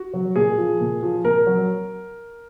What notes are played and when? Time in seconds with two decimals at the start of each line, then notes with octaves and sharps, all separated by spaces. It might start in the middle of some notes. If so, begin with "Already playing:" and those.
Already playing: F#4
0.14 F#3
0.36 A#2 G#4
0.58 F3
0.80 A#2
1.03 F3
1.24 A#2 A#4
1.47 F#3